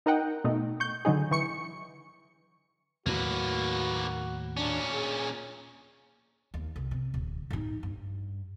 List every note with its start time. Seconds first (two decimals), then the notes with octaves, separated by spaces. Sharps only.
0.06 D#4 A#4 D#5 F#5 G5
0.44 B2 A3 D#4
0.80 C#6 G6
1.05 D3 F#3 D#4 G#4
1.31 E3 C#6 C#7
3.06 D#2 A2 F#3 A#3 F#4 B4
4.57 A#2 C#4 D4
4.93 G#4
6.54 D#2
6.76 C2
6.91 C3
7.14 D1
7.51 A1 D#4
7.83 G2